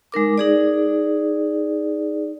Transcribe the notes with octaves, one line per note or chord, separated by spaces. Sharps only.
G#3 D#4 A#4 D6
D#4 G#4 D5